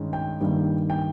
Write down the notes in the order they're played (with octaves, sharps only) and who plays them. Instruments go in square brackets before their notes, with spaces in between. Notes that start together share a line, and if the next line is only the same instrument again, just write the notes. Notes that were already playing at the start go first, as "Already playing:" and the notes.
Already playing: [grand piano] G2 D#3 G#3 C#4
G5
G2 D#3 G3 A#3
G5